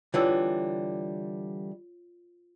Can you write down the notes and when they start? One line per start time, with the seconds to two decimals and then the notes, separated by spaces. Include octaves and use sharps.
0.14 D3 E3 G3 F4 C#5 E6